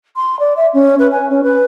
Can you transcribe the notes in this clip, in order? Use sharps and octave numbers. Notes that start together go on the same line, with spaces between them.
C6
D5
E5
C#4
B4
G#5
C#4
B4